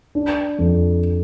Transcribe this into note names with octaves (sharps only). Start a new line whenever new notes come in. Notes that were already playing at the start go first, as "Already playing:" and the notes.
D4
F2